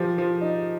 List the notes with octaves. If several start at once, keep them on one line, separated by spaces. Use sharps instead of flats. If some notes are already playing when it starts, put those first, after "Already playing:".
Already playing: F3 G4
F3
D#4